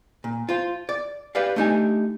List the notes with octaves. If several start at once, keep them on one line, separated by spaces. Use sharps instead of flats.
A#2
F4 C5
D5
G4 B4 D5 F5
A3 D4 D#4 G4 D#5 G#5